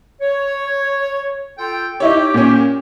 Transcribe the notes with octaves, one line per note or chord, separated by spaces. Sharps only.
C#5
F4 A4 G5
D#4 E4 G4 C#5
A#2 C#4